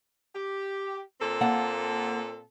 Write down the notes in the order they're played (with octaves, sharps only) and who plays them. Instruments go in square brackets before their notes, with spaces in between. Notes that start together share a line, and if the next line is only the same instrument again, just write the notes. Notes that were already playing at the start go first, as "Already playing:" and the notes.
[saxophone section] G4
A#2 C4 A4
[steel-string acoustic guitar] A#3 F#5 A5